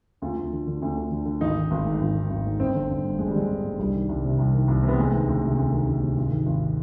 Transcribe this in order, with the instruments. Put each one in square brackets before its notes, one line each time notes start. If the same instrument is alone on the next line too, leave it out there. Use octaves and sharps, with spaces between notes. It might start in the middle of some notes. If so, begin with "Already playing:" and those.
[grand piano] D2 F4
D2
D3
D3
D2
D2
D3
D3
G#1 D#4
D#3
G#1
G#2
G#1
D#3
G#1
G#2
G1 C4
D3
G1
G2
G1 G#3
G3
D3 G#3
G1
G2
C2 G3
D#3
C2
C3
C2
D#3
C2
C3 B3
D2 G#3
D#3
D2
C3
D2
D#3
D2
C3
G#1
D#3
G#1